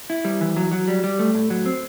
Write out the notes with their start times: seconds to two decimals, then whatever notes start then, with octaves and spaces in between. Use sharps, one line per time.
0.10 E4
0.25 G3
0.41 E3
0.56 F#3
0.71 F#3
0.88 G3
1.04 G3
1.19 A3
1.35 A2
1.50 F#3
1.66 C4